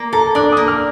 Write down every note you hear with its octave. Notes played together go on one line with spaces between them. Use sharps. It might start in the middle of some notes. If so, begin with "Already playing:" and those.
Already playing: A#3
A4 A#5
D4 D6
D#6
A#3
F6